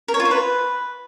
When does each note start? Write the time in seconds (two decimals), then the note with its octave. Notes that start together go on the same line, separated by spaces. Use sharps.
0.08 A#4
0.14 C#5
0.20 F4
0.25 C5
0.31 B4